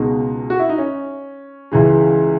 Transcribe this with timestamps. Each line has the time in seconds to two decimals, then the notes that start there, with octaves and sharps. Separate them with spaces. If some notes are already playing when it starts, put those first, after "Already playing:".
Already playing: C#2 B2 G#3 D#4 F#4
0.50 F#4
0.59 E4
0.69 D#4
0.78 C#4
1.72 C#2 C#3 E3 G#3